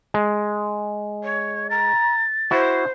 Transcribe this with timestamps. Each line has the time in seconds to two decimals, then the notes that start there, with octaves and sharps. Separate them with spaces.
0.14 G#3
1.23 C#5
1.70 A#5 A6
2.51 E4 F#4 C5